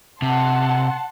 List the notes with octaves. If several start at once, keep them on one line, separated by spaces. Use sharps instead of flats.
C3 F#5 A5 C6